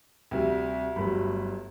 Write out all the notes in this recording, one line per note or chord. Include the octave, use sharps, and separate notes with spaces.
D2 C3 G3
G1 G2 F#3 A3 B5